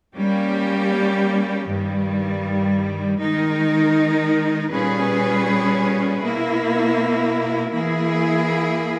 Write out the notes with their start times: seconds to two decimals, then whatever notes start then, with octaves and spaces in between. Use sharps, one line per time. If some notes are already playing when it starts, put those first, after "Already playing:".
0.15 G3 A#3 C#4 G4
1.66 G2 D#3 G3
3.19 D#3 G#3 D#4 A#4
4.70 A#2 G3 C#4 G#4 B4
6.21 B2 A#3 E4
7.72 E3 A#3 E4 G#4